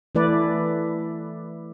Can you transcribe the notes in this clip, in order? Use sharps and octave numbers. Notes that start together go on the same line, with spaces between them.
E3 A3 E4 B4 D5